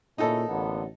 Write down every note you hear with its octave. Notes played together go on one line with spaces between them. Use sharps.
A#2 C#4 D#4 E4 G#4 A4
A1 D3 A#3 B3